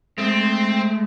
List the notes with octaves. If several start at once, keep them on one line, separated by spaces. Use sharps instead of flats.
G#3 A3 C4